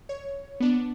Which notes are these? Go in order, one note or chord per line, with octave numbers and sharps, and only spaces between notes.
C#5
B3 D4